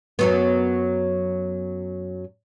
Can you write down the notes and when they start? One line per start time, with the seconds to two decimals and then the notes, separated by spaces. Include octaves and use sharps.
0.19 F#2 F#3 B3